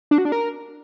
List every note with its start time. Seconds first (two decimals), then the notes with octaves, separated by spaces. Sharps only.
0.11 D4
0.18 F#4
0.25 D4
0.32 A#4